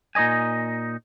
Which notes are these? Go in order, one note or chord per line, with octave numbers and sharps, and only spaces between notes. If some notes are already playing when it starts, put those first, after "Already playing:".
A#2 D#4 D5 D#5 G#5